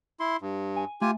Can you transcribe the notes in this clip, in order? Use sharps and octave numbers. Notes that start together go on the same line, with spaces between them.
E4 C6
G2
G#5
A3 F4 G4 G#5